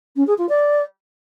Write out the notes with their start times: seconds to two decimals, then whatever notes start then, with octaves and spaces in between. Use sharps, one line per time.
0.16 C#4
0.27 G#4
0.38 F4
0.48 D5